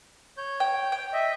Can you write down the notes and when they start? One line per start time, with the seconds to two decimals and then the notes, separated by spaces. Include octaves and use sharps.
0.38 C#5 G6
0.60 G5
0.92 G5
1.13 D#5 E5